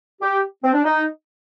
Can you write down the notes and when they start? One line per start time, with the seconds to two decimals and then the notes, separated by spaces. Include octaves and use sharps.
0.22 G4
0.64 C4
0.74 D4
0.85 D#4